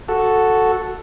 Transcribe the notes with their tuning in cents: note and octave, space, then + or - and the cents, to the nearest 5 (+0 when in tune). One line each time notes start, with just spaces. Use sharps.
F#4 +0 A4 +0